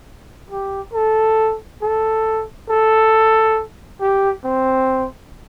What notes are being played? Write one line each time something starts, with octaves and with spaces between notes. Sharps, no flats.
G4
A4
A4
A4
G4
C4